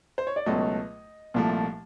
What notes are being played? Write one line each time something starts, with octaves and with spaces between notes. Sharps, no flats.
C5
C#5
D5
C#2 B2 F#3 A3 D#5
C2 A#2 F3 A3